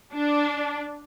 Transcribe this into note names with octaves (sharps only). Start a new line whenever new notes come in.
D4